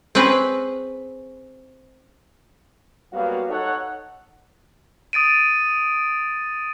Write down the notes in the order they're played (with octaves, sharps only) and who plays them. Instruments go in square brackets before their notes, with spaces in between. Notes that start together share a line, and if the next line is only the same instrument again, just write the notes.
[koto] C4 C#4 G#4 B4
[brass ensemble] F#3 G3 A#3 B3 F#4 F5
D#4 A4 C#5 F#5
[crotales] D#6 A6 D7 D#7